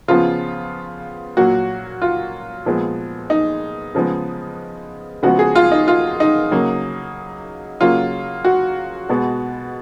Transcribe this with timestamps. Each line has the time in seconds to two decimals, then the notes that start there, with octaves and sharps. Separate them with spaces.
0.08 C#3 F3 B3 F4
1.37 A#2 F#3 A#3 F#4
2.02 F4
2.66 A#2 F3 G#3 B3
3.30 D#4
3.95 C#3 F3 G#3 B3
5.23 C#3 F3 G#3 B3 F#4
5.39 G#4
5.55 F4
5.72 D#4
5.88 F4
6.20 D#4
6.51 C#3 F#3 A#3
7.81 C#3 F#3 A#3 F4
8.45 F#4
9.09 B2 G#3 B3